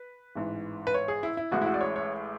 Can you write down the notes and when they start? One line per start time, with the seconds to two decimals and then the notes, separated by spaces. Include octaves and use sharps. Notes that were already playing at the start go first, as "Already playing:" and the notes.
Already playing: B4
0.35 A1 G#2 E3
0.87 B4
0.94 C#5
1.08 G#4
1.23 E4
1.37 E4
1.52 A1 A2 G#3 F#4
1.62 E4
1.66 F#4
1.74 D5
1.81 C#5
1.96 C#5